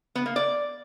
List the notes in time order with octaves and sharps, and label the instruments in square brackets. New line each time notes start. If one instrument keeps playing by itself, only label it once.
[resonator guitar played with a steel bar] B3
A#3
D5